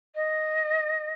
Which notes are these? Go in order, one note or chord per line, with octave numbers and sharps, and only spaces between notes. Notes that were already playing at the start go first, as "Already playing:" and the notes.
D#5